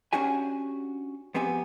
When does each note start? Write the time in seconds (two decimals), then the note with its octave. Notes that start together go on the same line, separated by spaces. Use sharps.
0.13 C#4 D4 F#4 G4 G#5
1.34 F2 B3 C4 G4 G#5